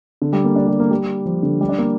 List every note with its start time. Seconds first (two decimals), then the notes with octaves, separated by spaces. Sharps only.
0.22 D3
0.33 G3
0.44 A#3
0.56 D4
0.68 G3
0.80 A#3
0.91 G3
1.26 F3
1.43 D3
1.61 G3
1.69 D4
1.78 A#3